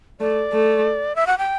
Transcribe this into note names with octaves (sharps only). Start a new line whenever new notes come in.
A3 D5
A3
E5
F#5
G5